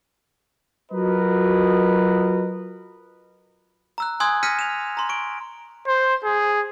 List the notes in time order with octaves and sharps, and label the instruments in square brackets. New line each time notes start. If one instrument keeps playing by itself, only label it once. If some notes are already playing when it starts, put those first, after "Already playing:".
[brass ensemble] F#3 F4 F#4 A#4 B4 D#5
[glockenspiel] A#5 E6 F#6
G#5 C6 D#6 E6 F#6 G#6
F6 G6 A#6 B6 C#7 D#7
E7 F7
A#5 C6
C#6 D7
[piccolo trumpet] C5
G#4